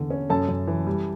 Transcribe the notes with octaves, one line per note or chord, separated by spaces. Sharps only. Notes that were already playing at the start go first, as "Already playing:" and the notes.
Already playing: E2 D3
C#4
F#2 A4 A5
F#2
E3
G3